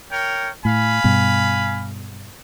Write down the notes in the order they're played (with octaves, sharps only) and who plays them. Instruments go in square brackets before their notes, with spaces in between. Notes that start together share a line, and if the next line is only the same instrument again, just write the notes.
[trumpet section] A#4 C#5 G5
[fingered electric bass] A2 [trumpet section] F5 G#5 B5
[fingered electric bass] G2 B2